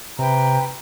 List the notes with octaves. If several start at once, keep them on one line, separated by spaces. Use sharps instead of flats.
C3 B4 G5 A#5